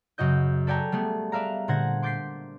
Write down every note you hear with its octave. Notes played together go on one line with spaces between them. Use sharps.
F#2 C#3 F#4 D#5 G6
A4 B4 D5 G5 G#5 A#5
G3 A3 B3 G#4
B4 D5 E5 F5 A#5
A#2 D3 C5 F#5 G#6 A#6
C6 D6 G6 A6 B6 C7